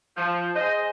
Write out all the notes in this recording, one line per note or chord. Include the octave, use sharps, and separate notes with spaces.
F3
G#4 C5 D#5